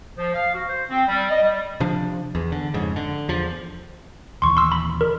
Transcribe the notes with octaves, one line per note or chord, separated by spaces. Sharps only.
F3
F5
F#4
C5
C4
G3
D#5
G3
C3 F3 D4
E2
D3
F2 G#2 C#3
D3
E2 F3
D#1 D#2 E3 C6 C#6
C6 E6
B5
A#4